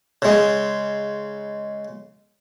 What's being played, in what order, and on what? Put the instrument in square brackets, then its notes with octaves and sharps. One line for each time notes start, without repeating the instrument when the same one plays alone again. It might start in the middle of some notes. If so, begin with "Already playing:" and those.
[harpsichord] C#3 G#3